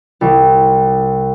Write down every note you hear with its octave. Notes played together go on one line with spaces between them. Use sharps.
C2